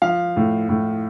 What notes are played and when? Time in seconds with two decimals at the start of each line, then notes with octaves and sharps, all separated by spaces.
0.02 F3 F5
0.36 A2
0.69 A2